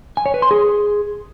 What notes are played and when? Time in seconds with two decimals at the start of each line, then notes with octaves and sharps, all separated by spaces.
0.17 G#5
0.26 C#5
0.34 B4
0.42 C6
0.51 G#4